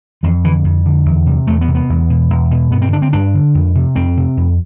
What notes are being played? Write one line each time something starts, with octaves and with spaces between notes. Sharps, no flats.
F2 E3
D3 E3
F2
D3
E2
C3
E2 A3
B3
C3
B3
E2
B2
E2
B2
G2 B3
C4
D3 D4
C4
G2 D4
D3
F2
C3
F2 C4
C3
F2